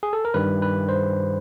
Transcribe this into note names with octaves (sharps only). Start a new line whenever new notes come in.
G#4
A4
A#4
G2 D#3 G3 B4
B4
C5